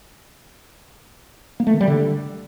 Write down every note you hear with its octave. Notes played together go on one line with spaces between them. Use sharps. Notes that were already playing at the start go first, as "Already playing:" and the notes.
A#3
A3
D#3
G3
D3